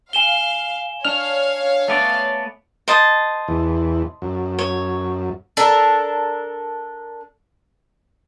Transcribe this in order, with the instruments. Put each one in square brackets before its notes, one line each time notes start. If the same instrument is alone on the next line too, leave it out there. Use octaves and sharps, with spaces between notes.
[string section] F5 [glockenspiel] G#5 E7 G7
[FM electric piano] D4 F6 [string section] C#5 F5 [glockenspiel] F7
[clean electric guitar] A3 B3 D5
[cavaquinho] C5 D#5 A5
[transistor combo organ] E2
F#2
[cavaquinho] C#5
[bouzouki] D4 A4 A#4